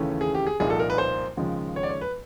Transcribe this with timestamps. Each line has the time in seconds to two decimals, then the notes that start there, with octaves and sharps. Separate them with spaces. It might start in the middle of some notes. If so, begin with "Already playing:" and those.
Already playing: D#2 C#3 E3 A3 C#4
0.21 G#4
0.35 G4
0.47 G#4
0.60 C2 A#2 F3 A#3 D#4 G#4
0.70 A4
0.79 A#4
0.90 B4
0.98 C5
1.37 D#2 C#3 F3 G#3
1.76 C#5
1.83 D5
1.89 C#5
2.01 B4